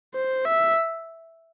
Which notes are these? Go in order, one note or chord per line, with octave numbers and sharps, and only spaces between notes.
C5
E5